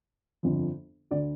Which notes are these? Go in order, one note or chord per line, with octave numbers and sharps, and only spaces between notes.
G1 F2 D3 F3
D2 D3 D5